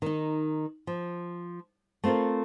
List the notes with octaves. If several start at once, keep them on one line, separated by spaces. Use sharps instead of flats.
D#3 D#4
F3
A3 C4 F4 A4 A#4